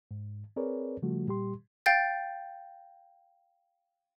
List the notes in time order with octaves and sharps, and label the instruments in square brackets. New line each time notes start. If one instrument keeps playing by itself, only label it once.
[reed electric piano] G#2
C4 G#4 A#4 B4 C#5 D5
C#3 F3 G3 A3 F#4
A#2 G3 G4 C6
[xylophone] F5 G5 G6 A6